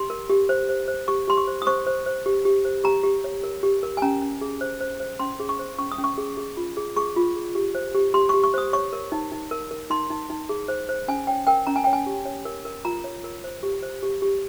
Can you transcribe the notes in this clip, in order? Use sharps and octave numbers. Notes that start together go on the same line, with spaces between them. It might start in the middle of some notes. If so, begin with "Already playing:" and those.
Already playing: G4 C6
A#4
G4
C5
C5
C5
G4 C#6
G4 C6
C#6
C5
D#6
C5 C#6
C5
C5
G4
G4
C5
G4 A#5
G4
C#5
A#4
G4
A#4
G#5
C#4 A#5
C#4
G#4
C5
C5
C5
C#4 C6
G#4
C#6
C5
C#4 C#6
D#6
C#4
C#6
G#4
G#4
F4
G#4
G#4 C#6
F4
G#4
G4
C5
G4
G4 C6
C#6
G4
C#6
C5 D#6
C#5 C#6
A#4
D#4
D#4
A#4
A#4
D#4 C6
D#4
D#4
G#4
C5
C5
C#4 G#5
C#5 G5
A#4 G5
C#4 A#5
G#5
C#5 G5
G#5
G4
C#5
A#4
A#4
F4 A#5
C#5
A#4
C5
G4
C5
G4
G4